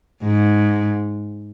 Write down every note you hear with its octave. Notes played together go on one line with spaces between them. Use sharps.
G#2